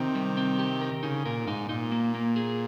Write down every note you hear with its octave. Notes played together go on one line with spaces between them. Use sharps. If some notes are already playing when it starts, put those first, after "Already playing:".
Already playing: C3 D#3 C4
G3
C4
G4
A#4
C#3 D#4
A#2 A#4
G#2 D#4
A#2 D#4
A#3
A#3
G#4